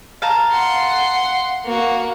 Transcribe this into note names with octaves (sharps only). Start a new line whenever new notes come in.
F5 A5 A#5
F#5 C6
A#3 F#4